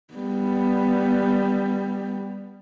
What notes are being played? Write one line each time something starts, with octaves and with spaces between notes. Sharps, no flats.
G3 B3